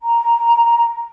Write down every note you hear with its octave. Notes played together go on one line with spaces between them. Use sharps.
A#5